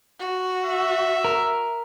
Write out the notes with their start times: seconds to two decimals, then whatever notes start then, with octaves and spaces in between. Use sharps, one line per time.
0.19 F#4
0.65 E5
1.25 A#4